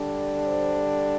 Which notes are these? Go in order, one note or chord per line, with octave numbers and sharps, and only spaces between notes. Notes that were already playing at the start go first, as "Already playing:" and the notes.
Already playing: D3 G3 D4
C5